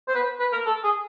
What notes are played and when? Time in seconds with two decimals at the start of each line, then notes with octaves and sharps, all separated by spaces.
0.08 C5
0.15 B4
0.40 B4
0.53 A#4
0.66 A4
0.84 G#4